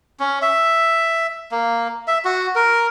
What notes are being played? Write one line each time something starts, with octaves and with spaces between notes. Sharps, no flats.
C#4
E5
A#3
E5
F#4
A#4